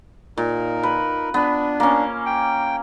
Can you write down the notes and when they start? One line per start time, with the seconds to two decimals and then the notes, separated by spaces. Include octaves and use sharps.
0.37 A#2 D#4 A#4
0.83 B4
1.34 B3 D4
1.80 A#3 C#4
2.26 G5